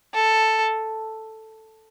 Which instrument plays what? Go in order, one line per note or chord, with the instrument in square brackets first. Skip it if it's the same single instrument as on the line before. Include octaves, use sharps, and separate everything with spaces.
[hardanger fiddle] A4